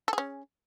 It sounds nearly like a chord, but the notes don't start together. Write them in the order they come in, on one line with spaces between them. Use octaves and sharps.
A4 G#4 C#4